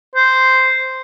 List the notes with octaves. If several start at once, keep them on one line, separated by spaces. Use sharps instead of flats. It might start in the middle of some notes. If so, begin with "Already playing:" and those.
C5